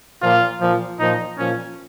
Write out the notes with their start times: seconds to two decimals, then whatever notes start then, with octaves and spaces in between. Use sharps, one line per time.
0.22 A#2 F3 F4
0.61 A#2 F3
1.00 A#2 F3 D#4
1.39 A#2 F3 C#4